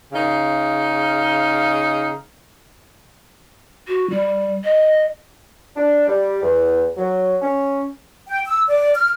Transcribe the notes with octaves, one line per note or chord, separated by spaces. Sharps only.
C#3 D#4 F5
F#4
G3
D#5
D4
G3
E2
F#3
C#4
G5
E6
D5
F6